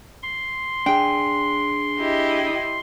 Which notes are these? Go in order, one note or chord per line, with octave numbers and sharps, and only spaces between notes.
C6
D4 G#4 G5
E4 G4 D#5